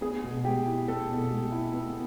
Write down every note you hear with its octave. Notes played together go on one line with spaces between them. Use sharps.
B3 G#4
B2
G#3 G4
E4
B3 A4
B2
G#3
E4
B3